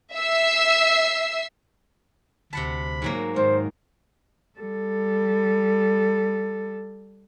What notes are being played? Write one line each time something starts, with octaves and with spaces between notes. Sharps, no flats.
E5 E6 C7
D2 C3 F#5 A5 B5
G#2 F#3 A#3
G#2 D#3 C5
G3 A4